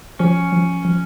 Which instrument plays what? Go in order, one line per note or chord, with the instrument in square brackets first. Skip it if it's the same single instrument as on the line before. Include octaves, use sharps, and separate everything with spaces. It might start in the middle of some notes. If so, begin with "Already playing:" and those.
[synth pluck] F3 [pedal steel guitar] C#4
[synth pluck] F3
F3